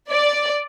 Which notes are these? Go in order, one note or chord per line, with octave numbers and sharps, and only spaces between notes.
D5